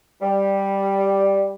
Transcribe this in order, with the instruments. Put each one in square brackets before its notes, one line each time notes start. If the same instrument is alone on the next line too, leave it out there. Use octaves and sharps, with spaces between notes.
[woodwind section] G3